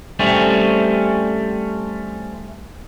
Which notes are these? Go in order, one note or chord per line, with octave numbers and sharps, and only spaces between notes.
G3 A3 C4 C#4